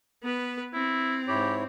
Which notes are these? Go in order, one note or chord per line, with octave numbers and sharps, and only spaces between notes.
B3 B4
C4 E4
G#2 E4 G4 C#5